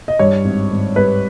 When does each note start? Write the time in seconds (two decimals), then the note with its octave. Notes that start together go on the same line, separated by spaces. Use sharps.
0.08 D#5
0.19 G2 C#5
0.45 G#1
0.71 G#1
0.96 G3 B4